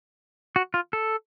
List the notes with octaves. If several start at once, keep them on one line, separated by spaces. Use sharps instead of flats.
F#4
F4
A4